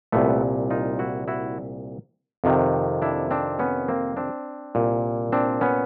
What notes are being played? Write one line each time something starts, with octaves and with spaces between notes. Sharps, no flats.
C2 A#2 A3 B3
D#4 F4
E4 F#4
E4 F#4
F2 C3 D#3
D4 E4
C4 D4
B3 C#4
A#3 C4
C4 D4
C2 A#2
C4 D4
B3 C#4